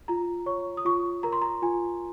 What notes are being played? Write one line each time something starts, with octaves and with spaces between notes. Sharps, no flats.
F4 A#5
C#5 C#6
D#6
F4 C#6
A#4 A#5
C6
A#5
F4 G#5